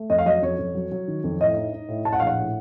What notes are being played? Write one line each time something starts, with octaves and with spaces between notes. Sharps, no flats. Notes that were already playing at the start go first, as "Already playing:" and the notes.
Already playing: A3
F2 D#5
F5
F#3 D#5
F2 C#5
F2
F#3
F#3
D#3
F2
A2 D#5
D#4
D#4
A2
A2 A5
F#5
A#1 F5
F#5
A2